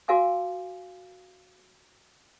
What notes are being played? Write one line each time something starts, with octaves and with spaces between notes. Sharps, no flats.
F#4 A#4 F5 G#5 D6